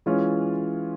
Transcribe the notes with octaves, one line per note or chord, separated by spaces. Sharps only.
E3 G#3 C#4 F4